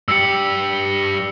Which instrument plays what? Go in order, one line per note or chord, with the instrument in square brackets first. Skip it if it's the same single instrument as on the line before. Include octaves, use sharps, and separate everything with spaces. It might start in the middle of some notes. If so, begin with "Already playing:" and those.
[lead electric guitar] G2 G4 [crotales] E6 C#7